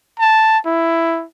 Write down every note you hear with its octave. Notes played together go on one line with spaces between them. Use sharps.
A5
E4